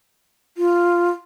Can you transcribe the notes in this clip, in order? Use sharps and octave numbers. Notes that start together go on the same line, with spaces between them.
F4